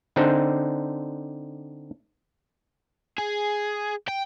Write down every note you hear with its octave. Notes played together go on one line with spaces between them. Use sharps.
D3 C4 D4 D#4 C5
G#4
G5